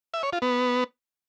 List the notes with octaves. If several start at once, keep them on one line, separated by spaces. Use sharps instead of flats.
E5
C#5
F4
B3